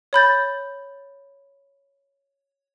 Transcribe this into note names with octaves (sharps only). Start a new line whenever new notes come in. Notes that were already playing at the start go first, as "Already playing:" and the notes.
C#5 B5 G6 A6